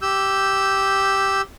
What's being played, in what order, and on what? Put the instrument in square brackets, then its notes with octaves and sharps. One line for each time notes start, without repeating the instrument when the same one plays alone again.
[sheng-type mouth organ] G4 E6 G6